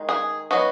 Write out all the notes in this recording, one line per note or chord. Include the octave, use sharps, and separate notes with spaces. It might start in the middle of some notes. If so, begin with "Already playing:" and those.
Already playing: D#3 G#3 D#4
G#4
F#3 B3 D#4 F#4